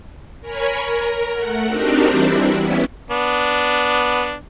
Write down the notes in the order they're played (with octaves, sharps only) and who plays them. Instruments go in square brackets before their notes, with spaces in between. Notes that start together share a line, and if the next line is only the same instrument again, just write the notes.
[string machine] A#4 C#5 G#5 B5
A#4
A3 F#5
C4 D4 D#4 F#4 G4 A#4
E3 G3 C4 D4 E4
B3 C#4 E4
[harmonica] B3 D4